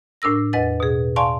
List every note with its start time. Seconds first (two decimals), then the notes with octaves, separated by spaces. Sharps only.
0.22 A2 D4 A#4 E6 A#6
0.53 E2 B4 D#5 F#5 A6
0.80 B2 G#4
1.16 D5 F5 G#5 A5 C6 C#6